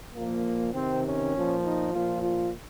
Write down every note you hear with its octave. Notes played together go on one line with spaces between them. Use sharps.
A#2 F3 A#3
C3 D#3 C4
C#4
A#2 F3
D#4
A#2 F3 F4
F4